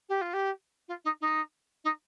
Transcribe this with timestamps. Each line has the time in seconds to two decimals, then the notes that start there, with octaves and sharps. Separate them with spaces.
0.09 G4
0.21 F4
0.33 G4
0.88 F4
1.04 D#4
1.21 D#4
1.84 D#4